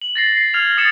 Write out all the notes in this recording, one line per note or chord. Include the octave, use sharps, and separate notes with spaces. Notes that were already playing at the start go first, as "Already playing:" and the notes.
F#7
A6 A#6 C7
C7
F6 G#6 F7
D#6 A6 C#7 E7